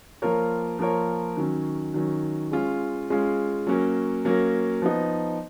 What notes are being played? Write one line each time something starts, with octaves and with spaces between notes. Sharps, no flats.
F3 A#3 F4 A#4 C#5
F3 A#3 F4 A#4 C#5
D#3 F#3 C#4
D#3 F#3 C#4
G#3 C#4 F4
G#3 C#4 F4
F#3 A#3 C#4
F#3 A#3 C#4
F3 B3 D#4